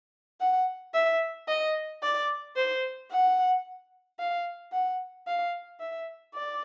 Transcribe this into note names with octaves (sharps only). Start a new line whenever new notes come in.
F#5
E5
D#5
D5
C5
F#5
F5
F#5
F5
E5
D5